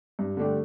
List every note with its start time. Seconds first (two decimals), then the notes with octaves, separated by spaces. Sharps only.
0.19 G2
0.37 D3 A3 D4 G4